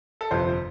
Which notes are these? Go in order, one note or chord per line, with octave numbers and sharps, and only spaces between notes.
A4
G1 F2 C3 C5